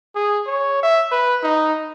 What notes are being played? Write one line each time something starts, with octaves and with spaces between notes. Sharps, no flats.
G#4
C#5
E5
B4
D#4